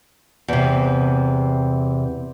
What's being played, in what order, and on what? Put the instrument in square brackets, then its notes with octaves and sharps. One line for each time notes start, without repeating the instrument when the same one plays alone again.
[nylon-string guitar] E2 C3